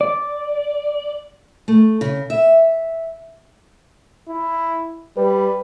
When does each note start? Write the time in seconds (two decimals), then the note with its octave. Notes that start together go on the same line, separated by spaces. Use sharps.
0.01 D5
1.68 A3
2.01 C#3
2.30 E5
4.28 E4
5.17 G3 B4